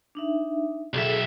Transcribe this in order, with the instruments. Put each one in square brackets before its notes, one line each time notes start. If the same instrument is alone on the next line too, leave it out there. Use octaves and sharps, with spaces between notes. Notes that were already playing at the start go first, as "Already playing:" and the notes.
[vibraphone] D4 D#4 E5
[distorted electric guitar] B1 E5 [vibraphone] G#4 A4 G5